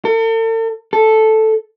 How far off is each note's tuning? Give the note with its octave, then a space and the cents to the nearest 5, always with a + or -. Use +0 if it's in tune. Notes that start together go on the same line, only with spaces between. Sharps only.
A4 +45
A4 -5